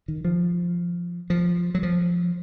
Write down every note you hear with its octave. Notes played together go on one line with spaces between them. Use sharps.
D#3
F3
F3
F#3
F3